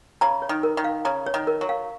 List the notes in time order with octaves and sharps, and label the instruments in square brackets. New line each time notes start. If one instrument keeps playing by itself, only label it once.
[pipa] C#3 [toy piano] A#5
[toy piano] C#5
[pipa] D#3
[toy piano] A#4
[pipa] D#3
[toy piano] F5
[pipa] C#3 [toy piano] A#5
[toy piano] C#5
[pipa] D#3
[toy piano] A#4
[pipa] F#3
[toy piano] F5